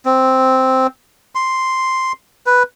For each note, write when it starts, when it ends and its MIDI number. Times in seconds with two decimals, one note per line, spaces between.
0.05 0.87 60
1.35 2.12 84
2.46 2.63 71